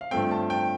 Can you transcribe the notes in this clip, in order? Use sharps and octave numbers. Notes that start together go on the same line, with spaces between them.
F5
G2 F3 A3 C4 G5
A5
G5